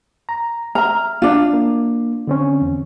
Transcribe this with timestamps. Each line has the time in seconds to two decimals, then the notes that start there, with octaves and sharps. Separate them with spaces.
0.29 A#5
0.75 E5 A#5 F6
1.22 D4 F4
1.53 A#3
2.27 D3 C4 C#4
2.61 E2